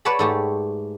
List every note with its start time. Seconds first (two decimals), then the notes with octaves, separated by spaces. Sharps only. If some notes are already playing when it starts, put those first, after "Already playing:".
0.05 B4 C#5 D5 F#5 A5 B5
0.19 G#2 A3 G4